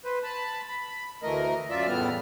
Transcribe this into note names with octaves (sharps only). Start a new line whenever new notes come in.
B4 C5
A5 B5
B5
D2 E3 A3 A#4 D#5
F#2 F4 D5 E5
E2 A2 G3 B3 F6